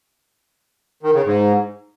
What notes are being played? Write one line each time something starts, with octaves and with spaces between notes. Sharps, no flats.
D#3
C#3
G#2